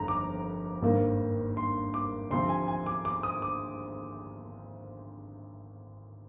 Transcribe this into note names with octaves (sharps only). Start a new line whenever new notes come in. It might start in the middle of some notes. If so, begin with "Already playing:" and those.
Already playing: G1 F2 D#3 A#5
D6
G#1 G2 D#3 A#3
C6
D6
D2 C3 F3 C6
G#5
G#5
D6
D6
D#6
D6